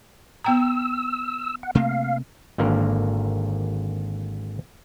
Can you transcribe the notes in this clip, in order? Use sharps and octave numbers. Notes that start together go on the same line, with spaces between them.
B3 G5 A#5 E6
F#5
C3 A3 A#3 F5
G#1 D3 A#3 A#4